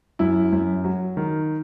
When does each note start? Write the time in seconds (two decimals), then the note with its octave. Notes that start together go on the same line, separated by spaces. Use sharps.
0.19 F#2 E4
0.53 F#2
0.84 F#3
1.17 D#3